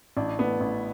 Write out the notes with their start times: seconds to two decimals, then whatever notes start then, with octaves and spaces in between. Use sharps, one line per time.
0.17 A1 D4
0.39 A2 B3
0.61 A1